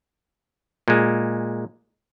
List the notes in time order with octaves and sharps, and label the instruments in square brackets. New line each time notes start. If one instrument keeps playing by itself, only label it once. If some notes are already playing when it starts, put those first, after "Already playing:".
[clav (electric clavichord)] A#2 G#3